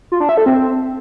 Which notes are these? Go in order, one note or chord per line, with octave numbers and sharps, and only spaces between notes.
F4
D4
E5
A4
C4